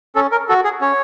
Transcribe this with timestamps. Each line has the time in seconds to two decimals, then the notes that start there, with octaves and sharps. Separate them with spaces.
0.15 C#4 A4
0.32 A#4
0.49 F#4 A4
0.64 G#4
0.81 C#4 C#5